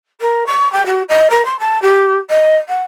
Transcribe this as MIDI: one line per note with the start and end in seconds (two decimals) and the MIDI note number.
0.20 0.46 70
0.46 0.70 85
0.72 0.85 79
0.85 1.02 66
1.08 1.27 75
1.30 1.44 70
1.45 1.58 84
1.59 1.80 81
1.82 2.16 67
2.29 2.55 75
2.68 2.82 78